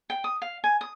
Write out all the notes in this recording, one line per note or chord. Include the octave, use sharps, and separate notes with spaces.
G5
D#6
F5
G#5
D#6